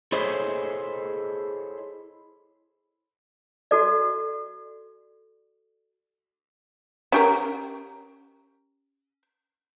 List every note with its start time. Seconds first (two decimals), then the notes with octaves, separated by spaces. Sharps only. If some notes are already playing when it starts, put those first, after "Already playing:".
0.12 E4 G#4 A4 C5 C#5 D#5
3.71 F#4 A4 D5
7.12 C#4 G4 A#4